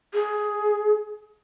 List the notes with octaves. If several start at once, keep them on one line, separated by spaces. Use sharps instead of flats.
G#4